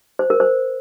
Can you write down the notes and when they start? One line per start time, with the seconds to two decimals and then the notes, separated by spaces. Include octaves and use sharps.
0.19 C5
0.30 A#4
0.40 C5